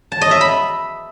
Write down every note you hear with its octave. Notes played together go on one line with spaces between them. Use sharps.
A5
D#5
E5
B5